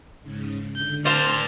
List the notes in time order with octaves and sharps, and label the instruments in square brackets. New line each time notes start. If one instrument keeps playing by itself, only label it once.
[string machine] G#2 C#3
[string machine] D3 [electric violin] G6
[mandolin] C5 [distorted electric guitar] D5 F5 [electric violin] A5 F6